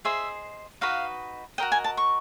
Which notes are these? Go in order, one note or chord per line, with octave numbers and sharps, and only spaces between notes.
G#4 C5 D#5 E5
D#4 F#4 B4 D#5 F5
F#4 A#4 D#5 G5
G#5
A5
C#6